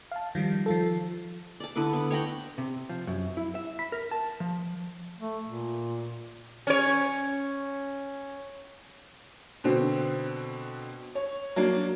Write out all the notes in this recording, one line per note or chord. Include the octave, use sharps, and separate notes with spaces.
F5 A5
D#3 F3 G3
F3 F4 A4
D5 A5
D3 E4 B4 D6
B3
C#5 G5 A#5 B5
C3
F3
F#2
E4
E5
B5
A#4
A5
F3
A3
A#2
C#4 C#5
B2 D3 C4
C#5
F#3 A#3 D4